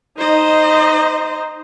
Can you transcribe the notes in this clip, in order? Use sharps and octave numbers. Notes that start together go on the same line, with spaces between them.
D#4 C5 D#5